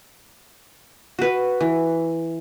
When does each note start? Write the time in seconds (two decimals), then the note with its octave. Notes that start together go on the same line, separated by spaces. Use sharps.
1.19 F#4 B4
1.61 E3